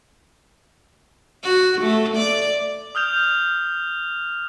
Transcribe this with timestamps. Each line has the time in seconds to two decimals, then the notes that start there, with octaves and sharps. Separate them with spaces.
1.43 F#4
1.81 A3
2.16 D5
2.95 D#6 F6 G6 F7